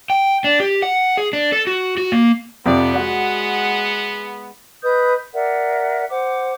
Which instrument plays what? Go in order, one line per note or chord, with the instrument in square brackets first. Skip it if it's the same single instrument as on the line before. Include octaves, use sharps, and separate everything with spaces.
[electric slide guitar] G5
D4
G4
F#5
G#4
D4
A4
F#4
F#4
A#3
[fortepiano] F2 C3 [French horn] B3 [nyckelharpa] D5
[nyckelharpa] G#3 F#5 [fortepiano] F#4
[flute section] B4 D#5 D#6 G6
A#4 D5 E5 F#5
C5 F#5 D6